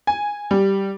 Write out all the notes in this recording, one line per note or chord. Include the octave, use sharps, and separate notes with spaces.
G#5
G3